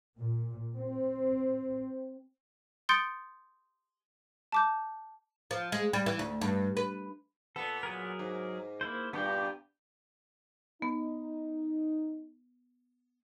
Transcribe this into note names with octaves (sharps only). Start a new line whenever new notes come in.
A#2
C4
C6 D#6 G6 A6 C#7 D7
A5 D6 G6
F3
G#3
G3
E3
D2
G2
B4
A#2 B3 A4
F#3 G#4 A#4
G#2
A#3 E4 C5
G2 A#2 B3 G4 G5
B3 D#4